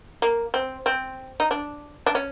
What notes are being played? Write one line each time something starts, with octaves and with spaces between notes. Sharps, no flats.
A#3
C4
C4
D#4
D4
D4
C#4